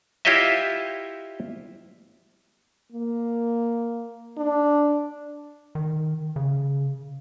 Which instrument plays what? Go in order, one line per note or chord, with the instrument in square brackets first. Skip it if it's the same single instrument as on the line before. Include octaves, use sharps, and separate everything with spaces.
[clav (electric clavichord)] E4 F4 G4 C#5 D#5 E5
[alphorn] A#3
D4
[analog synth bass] D#3
C#3